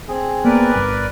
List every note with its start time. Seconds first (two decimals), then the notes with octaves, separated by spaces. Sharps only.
0.08 C4 G#4
0.45 A#3 B3 A#4 B4 D5
0.75 G1